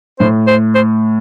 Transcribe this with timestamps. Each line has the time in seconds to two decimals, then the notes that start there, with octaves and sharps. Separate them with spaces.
0.19 A2 C5
0.47 C5
0.75 C5